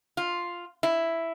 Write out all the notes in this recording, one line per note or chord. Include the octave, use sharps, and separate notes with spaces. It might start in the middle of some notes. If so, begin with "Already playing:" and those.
F4
E4